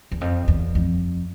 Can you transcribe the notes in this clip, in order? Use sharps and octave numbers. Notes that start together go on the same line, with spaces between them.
E2
F2
E2
F2